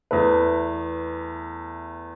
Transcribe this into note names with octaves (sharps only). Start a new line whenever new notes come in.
E2 A3 B4